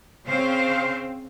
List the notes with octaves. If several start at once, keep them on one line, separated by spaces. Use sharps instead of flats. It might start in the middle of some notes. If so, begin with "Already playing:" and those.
C#3 C4 C5 F5